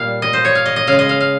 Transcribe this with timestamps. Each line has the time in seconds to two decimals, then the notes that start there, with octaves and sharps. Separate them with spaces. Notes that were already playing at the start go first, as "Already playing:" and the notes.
Already playing: A#2 G3 A#3 F5
0.22 D#5
0.33 C5
0.45 C#5
0.55 F5
0.66 D#5
0.76 D#5
0.87 C#3 G#3 F5
0.99 D#5
1.09 F5
1.20 F5